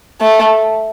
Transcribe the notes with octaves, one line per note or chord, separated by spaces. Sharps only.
A3